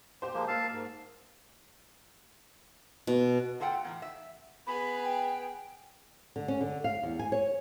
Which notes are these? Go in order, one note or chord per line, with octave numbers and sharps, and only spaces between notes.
B2 G4 C5
F3 G#3 A#3
A#3 F5 A5 E6
G#2
B2
A3 F4 A4 F#5 G5
A2 E3 A#3
E5
B3 G#4 B5
G5
D3
C#4
D3
F5
E2
G#5
C#5